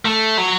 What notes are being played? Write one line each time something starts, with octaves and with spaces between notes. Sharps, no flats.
A3
F#3